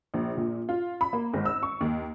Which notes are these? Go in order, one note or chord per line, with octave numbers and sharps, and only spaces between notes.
A#1
A#2
F4
B5
A#3
G#1
E6
C#6
D#2